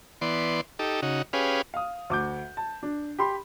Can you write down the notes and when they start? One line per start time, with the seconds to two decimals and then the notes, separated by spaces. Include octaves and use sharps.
0.21 E3 B3 D5 C6
0.79 D#4 G4 A4
1.02 C#3 D#4 F#4
1.33 C#4 G4 G#4 B4 F5
1.74 F5 D#6
2.10 D2 D6 G6
2.57 A5
2.83 D4
3.19 G4 B5 C6